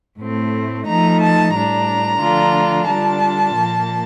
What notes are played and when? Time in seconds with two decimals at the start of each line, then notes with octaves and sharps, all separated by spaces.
0.20 A2 A3 C4
0.87 F3 A3 D#4 A#5
1.20 A5
1.54 A2 G3 D4 A#5
2.20 D3 F3 A3 D4 F4
2.87 D3 G3 D4 F4 A5
3.55 A#2 F3 A#3